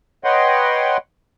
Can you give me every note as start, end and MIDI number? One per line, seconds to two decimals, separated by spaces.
0.24 0.97 71
0.24 0.97 73
0.24 0.97 75
0.24 0.97 78
0.24 0.97 79
0.24 0.97 84